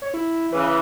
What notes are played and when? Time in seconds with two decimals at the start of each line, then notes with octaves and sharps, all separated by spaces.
0.02 C#5
0.14 E4
0.53 C#3 E3 B4